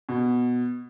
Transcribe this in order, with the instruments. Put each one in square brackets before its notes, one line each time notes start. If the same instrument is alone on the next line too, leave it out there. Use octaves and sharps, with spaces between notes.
[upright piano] B2